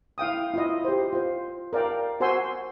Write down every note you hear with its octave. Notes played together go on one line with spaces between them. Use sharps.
E4 F5 G5 D#6
E4 F4 D#5
G4 C5
F4 C5
A#4 D5 F5 G5
F#4 C5 F#5 G#5 C6 E6